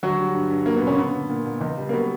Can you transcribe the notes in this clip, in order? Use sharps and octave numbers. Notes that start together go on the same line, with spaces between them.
D2 F#3 F#4
G3
G2
G2
F#3 A#3
A#2 B3
C#3 C#4
D3 B3
D3
A#2
A#2
C#2
G3
A#3
F#3 B3